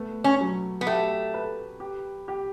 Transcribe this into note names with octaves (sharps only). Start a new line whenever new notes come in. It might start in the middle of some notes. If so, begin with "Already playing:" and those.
Already playing: A3 B3
C#4
F#3
B3
A3 G4
B4
G4
G4